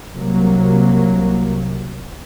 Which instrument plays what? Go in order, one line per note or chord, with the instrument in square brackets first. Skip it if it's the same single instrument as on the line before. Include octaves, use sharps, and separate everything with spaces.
[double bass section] C2 C3 F#3 A#3